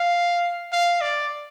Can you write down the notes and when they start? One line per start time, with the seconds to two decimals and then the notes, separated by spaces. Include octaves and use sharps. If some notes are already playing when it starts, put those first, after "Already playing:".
Already playing: F5
0.73 F5
1.01 D5